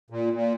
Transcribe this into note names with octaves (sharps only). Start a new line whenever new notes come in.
A#2
A#2